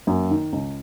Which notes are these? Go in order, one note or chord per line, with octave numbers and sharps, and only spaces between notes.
F#2 A#3
D#3
C#2